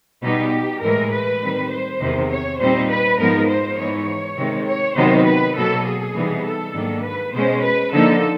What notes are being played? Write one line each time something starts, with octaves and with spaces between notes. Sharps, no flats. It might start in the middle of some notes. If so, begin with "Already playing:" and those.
B2 G3 B3 D#4 G4
A2 E3 G#3 A#4
B4
D#3 G3 C4
C5
E2 C3 D#3
C#5
A#2 G3 C4 D#4 C5
B4
G#2 F3 G#3 B3 D#4 A#4
C5
G#2 E3 G#3 B3 D#4 C#5
C3 D#3 G#3 C4
C#5
C3 D#3 F#3 B3 D#4 C5
B4
B2 F#3 A#3 A4
G#4
C3 E3 G3 B3 D#4
A4
G#2 D#3 F#3 A#3 D4
B4
B2 G#3 C#4 C5
B4
D3 F3 A#3 D#4 A4